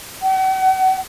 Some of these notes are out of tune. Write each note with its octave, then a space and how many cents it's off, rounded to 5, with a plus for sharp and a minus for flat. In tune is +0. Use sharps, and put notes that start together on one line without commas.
F#5 +40